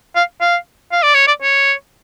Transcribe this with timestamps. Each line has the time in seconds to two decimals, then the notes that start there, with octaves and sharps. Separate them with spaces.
0.16 F5
0.41 F5
0.92 F5
1.03 D5
1.15 C#5
1.28 D5
1.42 C#5